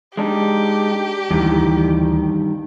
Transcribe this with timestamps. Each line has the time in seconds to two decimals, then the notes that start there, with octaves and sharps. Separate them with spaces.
0.17 G#3 D4 D#4 G4
1.31 D2 G2 D#3 E3 G3